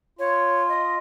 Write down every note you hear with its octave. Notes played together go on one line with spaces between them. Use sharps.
F4 C#5
D#5